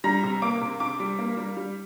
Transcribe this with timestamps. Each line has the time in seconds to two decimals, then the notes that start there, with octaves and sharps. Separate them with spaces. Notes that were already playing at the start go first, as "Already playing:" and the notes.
0.04 G3 A#5 A#6
0.23 C3
0.42 A#3 D6 D7
0.61 C3
0.80 C3 D6 D7
1.00 G3
1.19 A#3
1.37 G3
1.57 G3